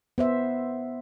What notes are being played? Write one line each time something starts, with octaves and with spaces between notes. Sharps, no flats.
B3 C5 E5